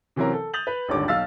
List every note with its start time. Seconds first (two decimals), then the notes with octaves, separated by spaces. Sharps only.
0.16 C3 E3 F#3 C4 C#4 A#4
0.33 A4
0.54 D#6 G6 A6 F7 F#7
0.67 B4
0.88 D#1 G#1 D#2 D3 C#5 D6
1.08 B1 F5 E6 A6